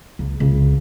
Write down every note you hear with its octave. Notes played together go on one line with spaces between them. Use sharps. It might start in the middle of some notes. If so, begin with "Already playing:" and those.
C#2
C#2